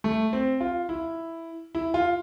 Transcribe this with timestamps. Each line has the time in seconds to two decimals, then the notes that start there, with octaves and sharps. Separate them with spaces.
0.04 A3
0.33 C4
0.61 F4
0.89 E4
1.75 E4
1.94 F4